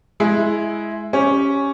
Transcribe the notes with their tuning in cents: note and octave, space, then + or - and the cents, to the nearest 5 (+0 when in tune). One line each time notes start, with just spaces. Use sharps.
G#3 +10 E4 +5 E5 +0
C#4 +0 G4 +0